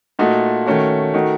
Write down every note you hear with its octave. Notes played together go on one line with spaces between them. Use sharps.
A#2 A3 D#4 F#4
D#3 A3 C#4 F#4
D#3 A3 D#4 F#4